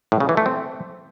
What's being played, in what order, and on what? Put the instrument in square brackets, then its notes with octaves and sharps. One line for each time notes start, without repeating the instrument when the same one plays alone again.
[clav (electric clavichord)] A2
C#3
E3
A3
C4